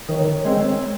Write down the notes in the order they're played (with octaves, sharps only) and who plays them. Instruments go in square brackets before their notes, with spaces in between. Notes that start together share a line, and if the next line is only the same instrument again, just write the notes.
[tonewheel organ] D#3 [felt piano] A#4 C#5
[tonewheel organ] G#3 C4